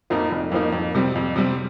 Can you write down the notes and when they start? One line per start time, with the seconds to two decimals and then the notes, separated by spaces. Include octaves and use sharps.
0.10 F2 F3 A#3 D#4
0.31 F1
0.52 F2 F3 A#3 D#4
0.72 F2
0.94 C3 G3 C4
1.15 F2
1.36 C3 G3 C4